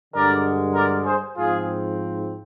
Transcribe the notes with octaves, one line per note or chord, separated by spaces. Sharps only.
G2 D3 G#3 A#4 D5
A#4 D5
G#4 C5
G#2 F3 C4 F4 G#4